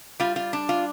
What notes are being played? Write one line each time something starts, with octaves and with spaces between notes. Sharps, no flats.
G3 F4
F4
D4
F4